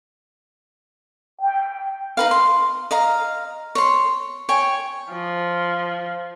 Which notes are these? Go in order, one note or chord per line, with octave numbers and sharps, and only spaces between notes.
G5
D#4 B4 F5
C6
D#5 F5 A#5
C#5 C6
C#5 G5 G#5
F3